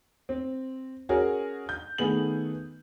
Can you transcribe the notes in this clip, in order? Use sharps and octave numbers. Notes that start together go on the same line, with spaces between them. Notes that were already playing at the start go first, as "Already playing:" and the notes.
C4
C#4 F#4 G#4 A#4
G6
D#3 A3 B3 G#4 F#7